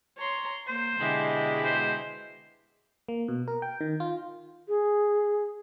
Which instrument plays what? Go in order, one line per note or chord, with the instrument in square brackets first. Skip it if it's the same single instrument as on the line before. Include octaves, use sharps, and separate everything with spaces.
[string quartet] C#5 A#5 C6
[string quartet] A#3 A#6 [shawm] C5
[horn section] B2 G#3 [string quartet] D3 E4 G4
[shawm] C5
[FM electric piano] A#3
B2
A#4
G5
D#3
F4
[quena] G#4